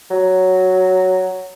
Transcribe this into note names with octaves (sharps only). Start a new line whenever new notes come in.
F#3